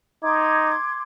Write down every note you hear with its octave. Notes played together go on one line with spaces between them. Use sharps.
D#4 C6 D6 G#6